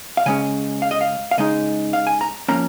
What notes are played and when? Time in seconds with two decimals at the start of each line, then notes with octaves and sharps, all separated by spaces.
0.17 F5
0.26 C#3 G#3 C#4 G#5
0.82 F5
0.91 D#5
1.01 F5
1.31 F5
1.38 C#3 G#3 D#4 D#5
1.93 F5
2.07 G#5
2.21 A#5
2.49 F3 A#3 C#4 A#5